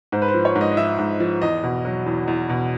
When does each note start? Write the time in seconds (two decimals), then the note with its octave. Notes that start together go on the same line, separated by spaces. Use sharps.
0.12 G#2 C5
0.22 B4
0.28 C5
0.34 F3
0.45 C#5
0.55 G#2
0.61 D#5
0.72 D#5
0.77 F3 E5
0.99 G#2
1.20 F3
1.42 E2 D#5
1.63 B2
1.85 F#3
2.06 E2
2.28 E2
2.49 B2